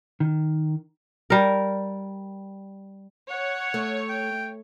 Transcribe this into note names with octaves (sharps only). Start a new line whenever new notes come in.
D#3
G3 A#4
C#5 F#5
A3
G5